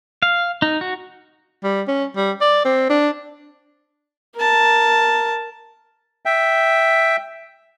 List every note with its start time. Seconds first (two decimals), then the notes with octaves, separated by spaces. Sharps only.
0.22 F5
0.62 D#4
0.81 F#4
1.64 G3
1.88 C#4
2.16 G3
2.41 D5
2.65 C4
2.90 D4
4.36 A#4 A5
6.25 E5 G5